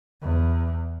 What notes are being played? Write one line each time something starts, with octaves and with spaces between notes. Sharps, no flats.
E2